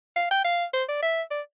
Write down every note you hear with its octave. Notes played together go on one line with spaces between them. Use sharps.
F5
G5
F5
C5
D5
E5
D5